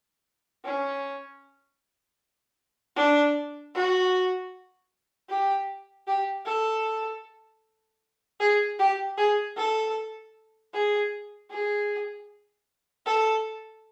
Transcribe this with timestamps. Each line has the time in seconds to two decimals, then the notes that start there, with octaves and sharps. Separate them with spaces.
0.64 C#4
2.96 D4
3.74 F#4
5.29 G4
6.07 G4
6.46 A4
8.40 G#4
8.79 G4
9.17 G#4
9.57 A4
10.73 G#4
11.50 G#4
13.06 A4